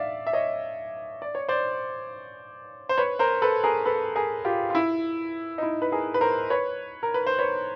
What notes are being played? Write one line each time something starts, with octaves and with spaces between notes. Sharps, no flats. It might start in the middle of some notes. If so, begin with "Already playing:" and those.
Already playing: D5 E5 F5
E5
C#5 D#5
D5
C#5
C5 D5
C5
B4 C#5
A#4 C5
A4 B4
G#4 A#4
A4 B4
G#4 A#4
F4 G4
F4
E4
D#4
E4
B4
G#4 A#4
B4
A#4 C5
B4 C#5
A#4
B4
C5
B4 C#5